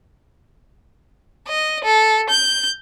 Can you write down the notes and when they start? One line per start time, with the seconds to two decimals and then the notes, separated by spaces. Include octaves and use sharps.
1.48 D#5
1.84 A4
2.30 G6